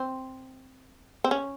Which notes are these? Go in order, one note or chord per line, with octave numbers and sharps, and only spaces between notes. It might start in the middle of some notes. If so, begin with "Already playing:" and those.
Already playing: C4
C4
C#4